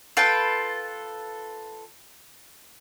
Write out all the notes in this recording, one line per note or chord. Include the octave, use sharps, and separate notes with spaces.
F4 A4 B4 G5